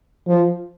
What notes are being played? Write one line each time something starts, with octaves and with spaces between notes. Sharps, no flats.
F3